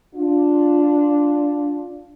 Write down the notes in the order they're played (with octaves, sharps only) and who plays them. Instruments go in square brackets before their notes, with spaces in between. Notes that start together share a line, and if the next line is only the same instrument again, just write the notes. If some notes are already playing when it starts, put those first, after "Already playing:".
[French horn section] D4 F4